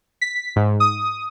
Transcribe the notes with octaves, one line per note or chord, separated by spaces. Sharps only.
B6
G#2
D#6